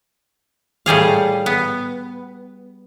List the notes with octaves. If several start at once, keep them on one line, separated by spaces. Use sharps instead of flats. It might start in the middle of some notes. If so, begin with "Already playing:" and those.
A2 G3 G#4 F5
B3